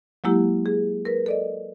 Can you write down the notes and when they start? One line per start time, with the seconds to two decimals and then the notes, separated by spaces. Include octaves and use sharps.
0.24 F#3 G#3 A#3 E4 G4
0.66 G#4
1.05 A#4 B4
1.26 A4 D5 D#5